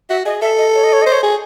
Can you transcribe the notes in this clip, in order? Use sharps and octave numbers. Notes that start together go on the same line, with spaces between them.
F#4 E5
G#4 D#5
A4 E5
D#5
C#5
D#5
C#5
D#5
C5
C#5
G#4